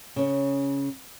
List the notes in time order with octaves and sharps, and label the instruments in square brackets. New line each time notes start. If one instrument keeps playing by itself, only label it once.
[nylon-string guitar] C#3 C#4